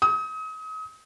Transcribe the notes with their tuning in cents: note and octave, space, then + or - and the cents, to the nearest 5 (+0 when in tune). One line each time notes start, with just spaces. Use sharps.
D#6 +35